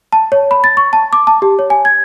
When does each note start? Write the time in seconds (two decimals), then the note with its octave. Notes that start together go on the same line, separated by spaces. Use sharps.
0.12 A5
0.32 C#5
0.51 B5
0.64 A6
0.77 C#6
0.93 A5
1.13 D6
1.27 A5
1.42 G4
1.59 C#5
1.70 G#5
1.85 G#6